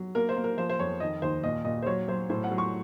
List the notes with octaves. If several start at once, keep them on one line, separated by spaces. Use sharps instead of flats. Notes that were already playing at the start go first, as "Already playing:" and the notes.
Already playing: F#3
A#3 A#4
C5
A#3
A#4
F3 C5
C5
F2 C#5
D#3 D#5
D#2 C5
A#2 D#5
A#2 D#5
C5
F#3 C#5
F#3 C5
A2 C5
F#5
F#3
C#6